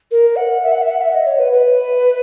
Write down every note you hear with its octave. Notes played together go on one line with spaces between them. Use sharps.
A#4
F#5
E5
F#5
E5
F#5
E5
D#5
C#5
B4
B4